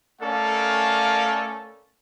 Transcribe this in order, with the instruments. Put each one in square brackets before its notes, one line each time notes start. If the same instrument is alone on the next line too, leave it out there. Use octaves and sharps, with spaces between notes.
[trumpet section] A3 C#4 A4 A#4 D5 F5